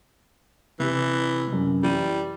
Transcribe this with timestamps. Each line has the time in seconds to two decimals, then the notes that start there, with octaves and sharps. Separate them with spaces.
0.80 C3 E3
1.48 F#2 C3
1.83 E3 G3 D#7